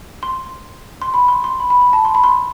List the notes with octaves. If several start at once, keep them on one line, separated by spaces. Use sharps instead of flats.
C6
C6
B5
C6
C6
B5
B5
B5
A5
C6
B5
C6